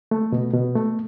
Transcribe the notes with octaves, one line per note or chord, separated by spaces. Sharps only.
A3
B2
B2
A3